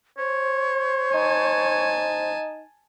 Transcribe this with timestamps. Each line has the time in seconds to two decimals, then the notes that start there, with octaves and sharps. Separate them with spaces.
0.18 C5 C#5
1.14 D#4 G#5 A5